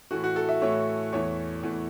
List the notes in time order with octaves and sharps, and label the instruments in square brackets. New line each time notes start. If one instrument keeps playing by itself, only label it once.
[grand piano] A2 E3 A3 F#4
F#4
A4
E5
A2 E3 A3 C#5
E2 E3 A3 C#5
E2 E3 A3